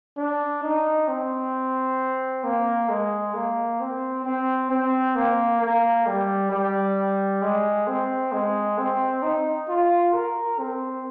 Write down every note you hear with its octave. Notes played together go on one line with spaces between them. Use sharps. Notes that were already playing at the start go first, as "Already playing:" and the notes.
D4
D#4
C4
A#3
G#3
A#3
C4
C4
C4
A#3
A#3
G3
G3
G#3
C4
G#3
C4
D#4
F4
A#4
C4